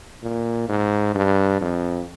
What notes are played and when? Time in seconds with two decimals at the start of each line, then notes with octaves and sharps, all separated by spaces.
0.23 A#2
0.69 G#2
1.15 G2
1.61 F2